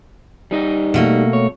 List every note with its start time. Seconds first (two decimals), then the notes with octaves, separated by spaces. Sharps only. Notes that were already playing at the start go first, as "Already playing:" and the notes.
0.51 G3 D#4 D#5
0.94 B2 A3 A#3
1.33 C#5